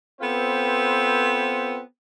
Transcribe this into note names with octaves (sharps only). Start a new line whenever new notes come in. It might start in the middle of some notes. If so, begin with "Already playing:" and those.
B3 C4 F4 A4 B4 C5